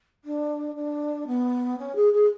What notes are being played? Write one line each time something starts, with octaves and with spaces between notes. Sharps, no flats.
D4
D4
B3
C#4
G#4
G#4